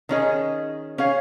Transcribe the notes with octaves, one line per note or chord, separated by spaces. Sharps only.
D#3 C#4 G#4 D#5
C#4 G#4 C#5 F5